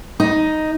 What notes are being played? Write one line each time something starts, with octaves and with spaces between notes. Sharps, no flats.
D#4